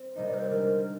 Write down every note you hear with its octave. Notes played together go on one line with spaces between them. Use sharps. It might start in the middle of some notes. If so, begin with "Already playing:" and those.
Already playing: C4
C3 G3 A#3 D#4 D#5
D5
A#4
C5
D3 G#3 D4 A#4